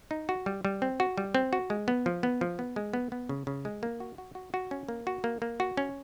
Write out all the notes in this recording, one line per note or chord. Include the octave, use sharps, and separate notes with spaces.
D#4
F#4
G3
G3
C4
F#4
G3
C4
F#4
G#3
B3
F3
B3
F3
B3
G#3
B3
B3
C#3
C#3
G#3
A#3
F#4
F#4
F#4
F#4
C#4
A#3
F#4
A#3
A#3
F#4
C#4